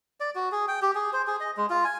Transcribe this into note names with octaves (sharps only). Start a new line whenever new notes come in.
D5
F#4
G#4
G5
G4
G#4
C5
G#4
D#5
G#3
F4
G#5